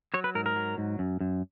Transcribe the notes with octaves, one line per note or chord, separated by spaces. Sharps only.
F#3 C#5
B4
G#2 A#4
A#4
F#3
G#2
F#2
F#2